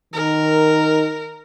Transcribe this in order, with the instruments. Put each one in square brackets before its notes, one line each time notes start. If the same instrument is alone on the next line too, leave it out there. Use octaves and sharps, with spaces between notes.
[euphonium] D#3 [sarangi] A#4